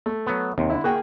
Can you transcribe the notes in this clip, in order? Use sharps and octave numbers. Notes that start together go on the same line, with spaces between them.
A3
F#3 B3
D#2 C3
D3 E4
A#3 F#4 G#4 G5